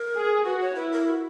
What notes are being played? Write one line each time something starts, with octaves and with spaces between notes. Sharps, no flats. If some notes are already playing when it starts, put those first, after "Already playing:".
Already playing: A#4
G#4
F#4 B4
C#5
E4 B4
A#4
F#4